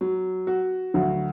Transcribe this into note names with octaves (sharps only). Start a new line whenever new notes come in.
F#3
F#4
D2 F#3